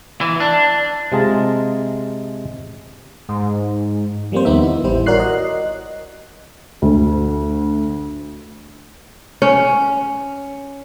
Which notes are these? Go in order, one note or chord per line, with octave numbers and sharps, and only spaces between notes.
E3
D4
C3 G#3 F4 G#4 A5 A#5
G#2
F3 G3 A#3 C4 C5
D#2 B3 D#4 E5
E4
A1 G3 E4 C5
F#4 A#4 C#5 D5 F#6 C7
D#5
D2
C#4